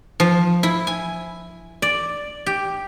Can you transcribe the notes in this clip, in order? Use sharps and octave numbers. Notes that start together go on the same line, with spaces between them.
F3
E4
G#5
D5
G4